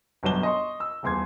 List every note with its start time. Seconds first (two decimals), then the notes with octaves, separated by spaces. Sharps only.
0.23 G1 B2 F#3 D4 E7 G7
0.43 D#5 C6 C#6
0.80 E6
1.03 D#1 E2 C6 G#6